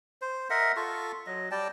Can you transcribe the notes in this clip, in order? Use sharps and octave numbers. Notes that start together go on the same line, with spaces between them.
C5
A#4 D#5 E5 F#5
F4 A4 C#6
F#3 D#5
G3 D5 G5 A5